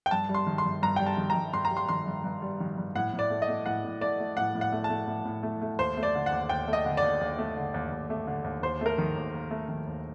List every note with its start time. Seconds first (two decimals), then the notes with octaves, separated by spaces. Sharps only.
0.06 G5
0.11 G2 A5
0.29 G3
0.34 C6
0.47 D#3
0.58 C6
0.65 G2
0.83 G2 A#5
0.96 G3 G5
1.06 A5
1.17 D#3
1.30 A#5
1.35 G2
1.53 G2 C6
1.65 A#5
1.71 G3
1.77 C6
1.89 D#3 C6
2.07 G2
2.24 G2
2.42 G3
2.60 D#3
2.78 G2
2.95 A2 F#5
3.13 A2
3.19 D5
3.30 A3
3.42 D#5
3.48 A3
3.66 A2 F#5
3.84 A2
4.01 A3 D5
4.20 A3
4.37 A2 F#5
4.55 A2
4.61 F#5
4.72 A3
4.84 A5
4.90 A3
5.07 A2
5.25 A2
5.43 A3
5.62 A3
5.79 D#2 C5
5.97 A3
6.03 D5
6.15 D3
6.26 F#5
6.32 D#2
6.49 D#2 G5
6.68 A3
6.73 D#5
6.85 D3
6.97 D5
7.02 D#2
7.21 D#2
7.39 A3
7.57 D3
7.74 D#2
7.92 D#2
8.10 A3
8.27 D3
8.44 D#2
8.62 D#2 C5
8.81 A3 A#4
8.98 D#3
9.16 D#2
9.34 D#2
9.51 A3
9.69 D#3
9.87 D#2